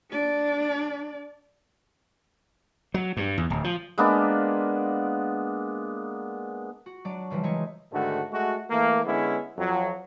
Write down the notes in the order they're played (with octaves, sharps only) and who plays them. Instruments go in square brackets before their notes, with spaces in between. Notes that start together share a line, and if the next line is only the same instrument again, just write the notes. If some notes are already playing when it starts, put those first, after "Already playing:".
[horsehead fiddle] D4 D5
[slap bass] F#3
G2
E2
D1
F3
[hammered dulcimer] G#3 A#3 B3 D4
[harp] F#4
F#3 D4 D5
C#3 E3 F3 G3
E3 G#3 D#4 C#5
[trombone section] G#2 D3 D#3 A3 F#4
G#3 A3 F#4
E3 A3 A#3
D3 G#3 B3 C#4 E4
F2 F#3